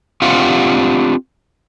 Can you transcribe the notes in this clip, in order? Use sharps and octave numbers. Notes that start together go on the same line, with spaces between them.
C4 D4 F4 G4 F5 F#5